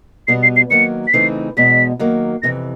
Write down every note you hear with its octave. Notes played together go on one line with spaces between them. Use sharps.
B2 G3 B3 C7
C7
C7
D#3 F#3 A#3 C#7
B6
C#3 E3 A3 C4 D#4 C7
E2 B2 G#3 B6
D#3 F#3 A#3
F2 C3 E3 A#6